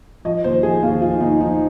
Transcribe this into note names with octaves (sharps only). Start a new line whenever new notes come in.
F3 D#5
D#2 C5
F3 G#4
D#2 F4
F3 F4
D#2 D#4
F3 D#4